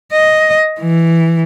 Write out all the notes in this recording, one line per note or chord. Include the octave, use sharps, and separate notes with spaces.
D#5
E3